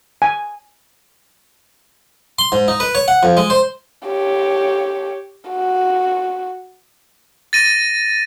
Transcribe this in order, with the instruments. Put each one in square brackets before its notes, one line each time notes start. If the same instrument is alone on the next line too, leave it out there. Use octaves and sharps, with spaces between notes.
[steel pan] G#5
[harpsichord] C6
G#2
D#4
B4
C#5
F#5
F2
G#3
C5
[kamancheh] G4 C#5
F#4
[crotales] A6 A#6 D#7